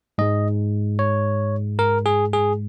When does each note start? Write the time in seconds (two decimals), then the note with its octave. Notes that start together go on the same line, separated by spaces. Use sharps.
0.18 G#2 G#3 D#5
0.99 C#5
1.79 A#4
2.06 G#4
2.33 G#4